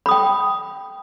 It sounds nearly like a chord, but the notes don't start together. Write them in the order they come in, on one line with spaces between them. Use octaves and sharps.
B5 D#6 G5